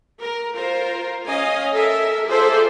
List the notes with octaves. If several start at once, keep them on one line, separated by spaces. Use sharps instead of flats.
A#4
F4 A#4 C5
C#4 D#5 F5 G#5
A4 A#4 E5
F4 G#4 A4 C5 D5 E5